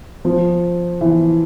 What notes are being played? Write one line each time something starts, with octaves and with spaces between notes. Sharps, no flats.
F3
E3